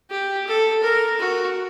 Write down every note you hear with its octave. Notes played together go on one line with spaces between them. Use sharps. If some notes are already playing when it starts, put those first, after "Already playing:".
G4
A4
A#4
F#4